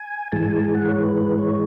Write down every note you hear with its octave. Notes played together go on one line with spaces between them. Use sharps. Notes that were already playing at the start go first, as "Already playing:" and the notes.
Already playing: G#5
G#2 E3 G#3 A5
G#5
A5
G#5
F#5
C#5
B4
B4
C#5